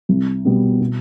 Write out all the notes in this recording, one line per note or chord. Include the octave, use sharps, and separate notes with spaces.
C2
B2 G3 B3
B2